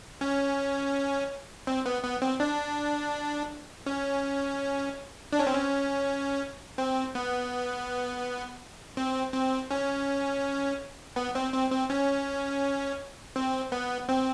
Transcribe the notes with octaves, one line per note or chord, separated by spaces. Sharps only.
C#4
C4
B3
B3
C4
D4
C#4
D4
C#4
C4
C#4
C4
B3
C4
C4
C#4
B3
C4
C4
C4
C#4
C4
B3
C4